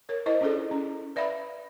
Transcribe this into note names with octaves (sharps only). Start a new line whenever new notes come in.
A#4 C#5
E4 A#4 C5 D#5
C#4 D4 F4 G#4 A4 D5
C#4
B4 D5 E5 F5 B5